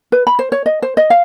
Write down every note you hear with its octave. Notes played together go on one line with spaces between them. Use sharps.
B4
B5
C5
C#5
D#5
C5
D#5
F5